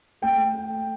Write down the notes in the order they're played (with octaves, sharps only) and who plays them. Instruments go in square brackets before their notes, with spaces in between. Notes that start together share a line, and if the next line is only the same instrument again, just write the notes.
[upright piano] A3 G5